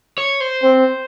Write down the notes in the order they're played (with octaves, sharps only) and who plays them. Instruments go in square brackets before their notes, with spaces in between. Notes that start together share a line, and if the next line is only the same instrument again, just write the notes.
[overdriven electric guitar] C#5
C5
[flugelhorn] C4